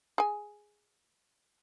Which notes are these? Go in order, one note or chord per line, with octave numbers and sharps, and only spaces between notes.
G#4 G#5